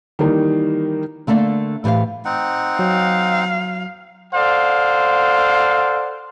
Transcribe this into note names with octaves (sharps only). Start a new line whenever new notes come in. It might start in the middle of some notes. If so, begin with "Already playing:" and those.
D#3 E3 G3 A#3 D#4
D3 A3 A#3 D4
A2 E3 G4 C5 F5
C4 D#4 F#5
F#3 F5
A4 C5 D5 F5 F#5